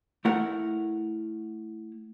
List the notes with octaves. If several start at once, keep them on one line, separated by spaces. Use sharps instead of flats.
A3 E4 A#4 F#5